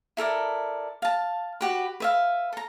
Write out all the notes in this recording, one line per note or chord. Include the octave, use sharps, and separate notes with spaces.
E4 A4 A#4 D5
F5 A5
F#4 G4 B4
B4 E5 F5
A4 A#5